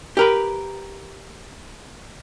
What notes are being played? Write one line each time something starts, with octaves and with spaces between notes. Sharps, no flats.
G4 A#4 B4